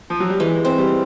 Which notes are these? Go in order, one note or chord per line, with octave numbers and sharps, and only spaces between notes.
F3
F#3
G3
E3 G#3
C4
G3